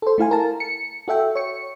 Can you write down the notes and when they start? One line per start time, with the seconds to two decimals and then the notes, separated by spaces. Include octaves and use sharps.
0.02 A4 C5
0.18 A3 E4 F5 G#5
0.31 A#4 A5
0.60 C#7
1.08 F#4 A4 E5 G5
1.35 C#5 C#7